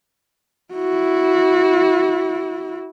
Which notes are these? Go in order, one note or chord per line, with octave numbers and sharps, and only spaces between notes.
E4 F#4